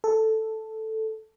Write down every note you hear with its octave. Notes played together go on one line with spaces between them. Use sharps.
A4